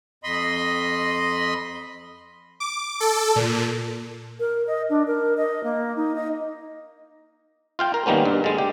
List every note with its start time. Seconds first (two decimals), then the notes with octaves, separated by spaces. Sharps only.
0.24 F2 D#5 B5 C6
2.60 D6
3.00 A4
3.36 A#2
4.39 A#4
4.67 D#5
4.89 D4
5.07 A#4
5.37 D#5
5.63 A#3
5.96 D#4
6.15 D#5
7.79 F4 F5 G5
7.94 A#4
8.06 D#3 G3 A#3 B3 C#4
8.25 G2
8.44 D3 G#3
8.58 G4